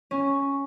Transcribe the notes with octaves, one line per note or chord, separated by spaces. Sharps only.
C#4